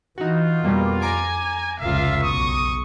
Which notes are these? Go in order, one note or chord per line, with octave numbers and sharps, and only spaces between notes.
E3 D#4 F4 F#4
F2 B2 G3 A#3
G#5 A#5 D6 D7
F1 C#2 F4 E5 F5
B1 C#6 D#6